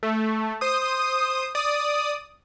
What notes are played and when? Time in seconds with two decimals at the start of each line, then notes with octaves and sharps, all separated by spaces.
0.03 A3
0.61 C5 D#6
1.55 D5 D#6